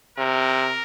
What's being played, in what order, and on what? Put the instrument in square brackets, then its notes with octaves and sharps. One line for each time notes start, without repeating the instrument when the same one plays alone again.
[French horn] C3 [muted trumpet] A#4